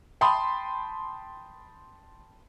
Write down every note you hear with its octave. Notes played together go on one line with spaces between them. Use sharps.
G5 A5 B5 C6 D#6